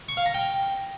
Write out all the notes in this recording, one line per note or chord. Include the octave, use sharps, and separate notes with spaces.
C#6
F5
A#5
G5